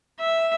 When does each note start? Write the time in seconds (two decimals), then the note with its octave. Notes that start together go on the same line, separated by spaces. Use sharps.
0.20 E5